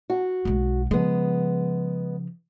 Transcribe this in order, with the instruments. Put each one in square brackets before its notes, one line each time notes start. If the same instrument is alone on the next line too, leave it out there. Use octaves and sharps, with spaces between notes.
[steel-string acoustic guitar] F#4
[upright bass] B1 G#3
[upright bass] C#3 F3 [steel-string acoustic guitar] G#3 B3